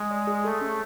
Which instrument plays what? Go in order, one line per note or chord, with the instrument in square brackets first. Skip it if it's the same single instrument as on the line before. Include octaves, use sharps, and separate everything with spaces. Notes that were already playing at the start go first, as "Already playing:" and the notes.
Already playing: [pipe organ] G#3
[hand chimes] D5
G#4
[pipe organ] A3 [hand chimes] A4
[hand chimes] C#4